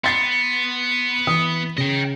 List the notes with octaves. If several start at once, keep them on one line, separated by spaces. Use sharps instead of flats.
B3 C6 A6 C7
E3 D#6
C#3 D#5 G5